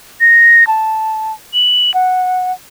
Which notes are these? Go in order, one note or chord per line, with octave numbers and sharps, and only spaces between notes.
A#6
A5
F#7
F#5